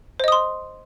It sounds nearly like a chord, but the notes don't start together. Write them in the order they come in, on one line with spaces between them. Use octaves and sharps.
C5 D#5 D#6 C6